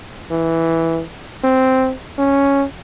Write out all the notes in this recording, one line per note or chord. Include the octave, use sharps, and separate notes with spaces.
E3
C4
C#4